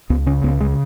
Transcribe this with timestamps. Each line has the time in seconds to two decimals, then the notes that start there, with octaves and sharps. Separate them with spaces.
0.10 C#2 B3
0.26 C#3 C#4
0.44 C#2 B3
0.60 C#3 G#3